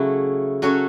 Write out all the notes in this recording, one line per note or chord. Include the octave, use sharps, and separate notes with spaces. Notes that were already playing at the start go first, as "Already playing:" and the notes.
Already playing: C#3 F#3 A3 C#4 E4
F#3 C#4 F#4 A4 C#5